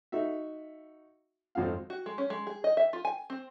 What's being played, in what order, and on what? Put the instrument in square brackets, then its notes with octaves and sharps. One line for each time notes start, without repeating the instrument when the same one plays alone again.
[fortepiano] D#4 F#4 E5
G#1 F2 F4 A4 F5
[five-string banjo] F#4
G#3
C#4
G#3
G#4
D#5
E5
F4
G#5
C4